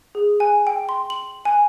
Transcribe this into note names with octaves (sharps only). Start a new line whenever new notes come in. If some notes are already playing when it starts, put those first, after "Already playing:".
G#4
G#5
G5
C6
F#7
G#5